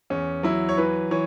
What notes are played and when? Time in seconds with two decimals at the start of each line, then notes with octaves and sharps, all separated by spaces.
0.10 E2 C#4
0.43 F#3 E4
0.69 C#5
0.77 E3 B4
1.11 E3 C#5